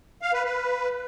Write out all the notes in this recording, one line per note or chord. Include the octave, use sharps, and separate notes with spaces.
F5
B4
B4